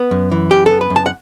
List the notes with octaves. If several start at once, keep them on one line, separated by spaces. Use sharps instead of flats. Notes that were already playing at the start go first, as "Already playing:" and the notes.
Already playing: B3
F#2
E3
F#2 G4
A4
B3
B4
F#2
A5
F#5